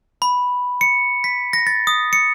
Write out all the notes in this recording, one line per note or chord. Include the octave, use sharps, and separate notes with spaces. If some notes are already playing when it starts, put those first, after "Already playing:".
B5
C#7
B6
A#6
A6
D#6
C#7